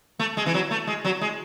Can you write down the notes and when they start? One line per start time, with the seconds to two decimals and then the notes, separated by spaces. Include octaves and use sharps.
0.19 A3
0.37 G#3
0.46 E3
0.54 F#3
0.71 A3
0.87 G#3
1.04 F#3
1.21 G#3